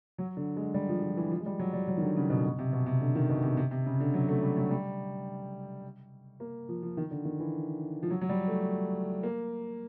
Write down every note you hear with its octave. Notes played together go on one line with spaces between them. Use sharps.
F#3
D3
G#3
G3
F3
F3
E3
F3
G#3
G3
F#3
G3
F#3
D#3
D3
C#3
B2
B2
C3
B2
C3
D3
D#3
B2
C3
C3
C3
C#3
D3
F#3
A3
G3
F#3
G3
A#3
F3
F3
D#3
D3
D#3
E3
F3
F#3
F#3
G3
A3
A#3